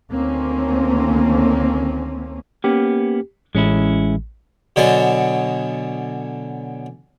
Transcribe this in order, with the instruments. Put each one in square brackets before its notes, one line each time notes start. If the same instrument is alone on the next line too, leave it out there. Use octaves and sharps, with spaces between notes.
[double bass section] D2 D#3 A#3 C4 C#4
[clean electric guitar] A#3 B3 C#4 [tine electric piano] G4
[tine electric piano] A1 [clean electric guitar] G#3 C#4 E4
[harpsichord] B2 D3 F#3 A4 G#5 D#6